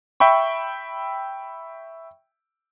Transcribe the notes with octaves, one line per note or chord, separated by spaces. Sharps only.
E5 G5 B5 C#6